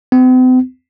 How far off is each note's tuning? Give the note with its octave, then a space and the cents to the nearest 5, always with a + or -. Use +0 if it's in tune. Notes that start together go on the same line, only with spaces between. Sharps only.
C4 -45